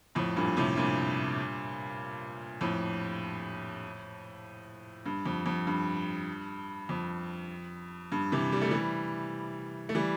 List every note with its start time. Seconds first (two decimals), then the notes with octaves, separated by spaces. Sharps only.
0.15 F2 A2
0.37 G2 A#2
0.57 A2 C3
0.77 G2 A#2
2.61 F2 A2
5.06 G2
5.26 F2
5.46 F2
5.67 G2
6.89 F2
8.12 G2
8.32 C3 E3
8.52 G3
8.62 A3
8.71 E3 G3
9.89 A3
9.95 E3 G3